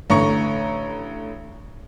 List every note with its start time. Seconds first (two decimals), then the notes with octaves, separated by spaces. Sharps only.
0.10 A1 D3 A#5 C#6 C#7